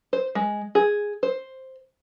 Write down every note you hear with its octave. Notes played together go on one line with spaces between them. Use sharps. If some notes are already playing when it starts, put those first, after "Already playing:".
C5
G#3
G#4
C5